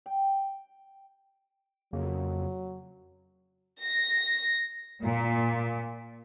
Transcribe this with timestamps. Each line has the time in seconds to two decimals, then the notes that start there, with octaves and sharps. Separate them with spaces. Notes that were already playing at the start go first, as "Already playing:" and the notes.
0.06 G5
1.93 F2 C#3 F#3 A#3
3.79 A#6
5.02 A#2